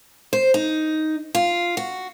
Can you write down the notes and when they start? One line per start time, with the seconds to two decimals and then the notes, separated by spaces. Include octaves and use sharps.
0.33 C5
0.54 D#4
1.35 F4
1.77 F#4